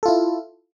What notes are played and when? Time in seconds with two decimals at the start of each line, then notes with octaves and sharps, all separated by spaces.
0.03 A4
0.06 F4
0.08 E4